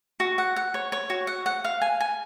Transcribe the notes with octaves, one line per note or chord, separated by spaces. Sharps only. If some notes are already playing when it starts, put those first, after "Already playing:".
F#4
F#5
F#5
C#5
C#5
F#4
F#5
F#5
F5
G#5
G#5